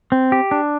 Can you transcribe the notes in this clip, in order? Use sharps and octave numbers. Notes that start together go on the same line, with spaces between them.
C4
G4
D4